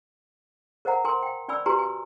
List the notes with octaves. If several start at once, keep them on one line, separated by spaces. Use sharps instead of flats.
A#4 C5 D#5 F#5 A#5
A#4 G#5 C6
G5
C#4 D5 G#5 B5 E6
F#4 G4 B4 G#5 A#5 C6
G#5